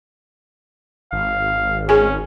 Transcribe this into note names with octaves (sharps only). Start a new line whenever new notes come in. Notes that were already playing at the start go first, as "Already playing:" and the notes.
G#1 F5
C#4 G#4 G#5